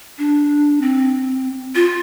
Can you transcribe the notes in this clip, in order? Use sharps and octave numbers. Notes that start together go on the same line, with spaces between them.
D4
C4
F4